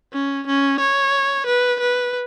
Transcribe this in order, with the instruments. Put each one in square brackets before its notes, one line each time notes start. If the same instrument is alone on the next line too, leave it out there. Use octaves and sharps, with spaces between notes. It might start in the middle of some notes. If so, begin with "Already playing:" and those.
[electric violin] C#4
C#4
C#5
B4
B4